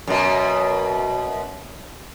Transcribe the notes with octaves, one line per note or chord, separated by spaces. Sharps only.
F#2 B2